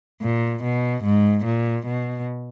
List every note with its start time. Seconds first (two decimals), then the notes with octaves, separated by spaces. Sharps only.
0.22 A#2
0.63 B2
1.04 G#2
1.45 A#2
1.86 B2